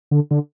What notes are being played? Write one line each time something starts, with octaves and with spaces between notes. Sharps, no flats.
D3
D3